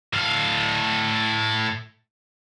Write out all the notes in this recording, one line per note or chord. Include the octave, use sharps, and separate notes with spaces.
A2 F5